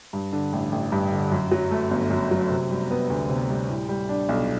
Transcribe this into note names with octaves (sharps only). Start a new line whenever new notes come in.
G2
D3
A1
A1
G2
D3
F#2
F#3
A3
G1
F#2
F#3
C3
G3
B3
D2
C3
G3
A2
G3
D4
B1